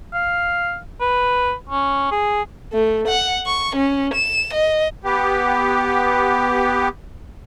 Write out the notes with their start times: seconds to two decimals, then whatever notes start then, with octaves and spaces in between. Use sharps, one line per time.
0.13 F5
1.00 B4
1.69 C#4
2.11 G#4
2.73 A3
3.08 F#5
3.46 C#6
3.75 C#4
4.14 E7
4.53 D#5
5.05 B3 G4